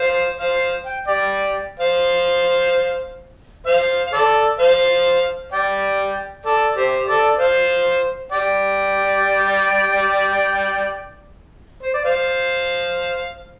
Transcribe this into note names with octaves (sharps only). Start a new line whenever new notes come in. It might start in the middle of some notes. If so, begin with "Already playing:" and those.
Already playing: C5 F5
C5 F5
G5
D5 G5
C5 F5
C5 F5
F5
A4 D5
C5 F5
D5 G5
A4 D5
G4 C5
A4 D5
C5 F5
D5 G5
C5
D5
C5 F5